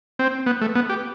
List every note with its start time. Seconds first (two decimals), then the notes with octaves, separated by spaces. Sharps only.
0.19 C4
0.46 B3
0.62 A3
0.75 B3
0.89 G4